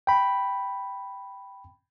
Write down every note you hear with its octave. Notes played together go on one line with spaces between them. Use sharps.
G5 B5